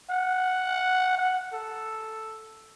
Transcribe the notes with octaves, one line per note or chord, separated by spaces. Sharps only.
F#5
F#5
A4